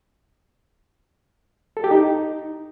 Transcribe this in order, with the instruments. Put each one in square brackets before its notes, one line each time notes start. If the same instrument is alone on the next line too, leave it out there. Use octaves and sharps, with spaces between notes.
[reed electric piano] A4
G4
D#4